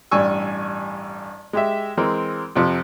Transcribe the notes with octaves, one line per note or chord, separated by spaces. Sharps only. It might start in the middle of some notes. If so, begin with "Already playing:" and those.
A1 G2 G3 G#5 C#6 E6
G#3 G4 E5
E3 G#3 C4 A#4
F2 C3 F3